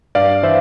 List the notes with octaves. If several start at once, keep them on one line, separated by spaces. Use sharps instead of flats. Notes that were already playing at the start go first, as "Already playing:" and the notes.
G2 D5 F5
E3 C5 E5